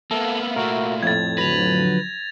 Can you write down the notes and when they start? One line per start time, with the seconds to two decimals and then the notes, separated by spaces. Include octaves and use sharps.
0.11 A#3 B3 A4 E5 F5
0.56 A#2 A3 F#4 A#4
1.03 F2 A2 G#6 A6
1.38 D3 F3 F#3 B4 A#6 F7